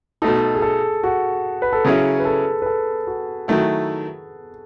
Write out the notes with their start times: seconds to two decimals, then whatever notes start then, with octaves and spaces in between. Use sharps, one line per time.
0.22 B2 A3 D#4 A4
0.54 G#4
0.62 A4
1.04 F#4
1.62 B4
1.73 A4
1.85 C#3 F#3 C#4 E4 G#4
2.19 B4
2.25 A4
2.62 B4
2.66 A4
3.07 F#4
3.48 D#3 F#3 A3 E4